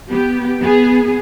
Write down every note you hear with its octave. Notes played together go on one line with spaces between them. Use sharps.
B3 G4
B3 G#4